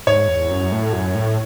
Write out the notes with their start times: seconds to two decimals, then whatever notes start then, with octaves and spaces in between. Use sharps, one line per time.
0.07 G#2 C#5
0.28 E2
0.50 F#2
0.72 A2
0.93 F#2
1.15 A2